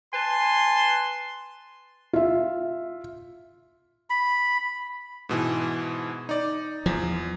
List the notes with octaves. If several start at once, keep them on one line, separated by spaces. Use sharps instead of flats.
B4 G#5 A5 C6
F4 E5
B5
G#2 B2 E3
D#4 D5
E2 F3